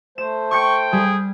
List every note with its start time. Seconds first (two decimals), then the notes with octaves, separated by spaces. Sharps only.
0.18 A3 C5 E7
0.51 G5 C#6 D6 G6 C#7
0.93 G3 G#4